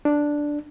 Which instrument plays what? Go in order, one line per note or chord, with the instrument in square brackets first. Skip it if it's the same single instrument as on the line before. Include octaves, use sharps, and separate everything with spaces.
[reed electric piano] D4